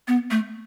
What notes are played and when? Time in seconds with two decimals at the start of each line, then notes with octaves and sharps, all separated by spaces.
0.08 B3
0.31 A3